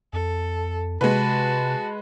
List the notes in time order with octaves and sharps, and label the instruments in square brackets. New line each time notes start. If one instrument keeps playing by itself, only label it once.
[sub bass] F2 [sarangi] A4
[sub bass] C3 [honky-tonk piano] G#3 B4 [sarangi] F#4 [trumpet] A5